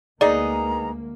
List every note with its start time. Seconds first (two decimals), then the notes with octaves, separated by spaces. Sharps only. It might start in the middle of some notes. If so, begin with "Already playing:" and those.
0.21 D2 G#3 A#3 B3 D#4 G#4 D5 A#5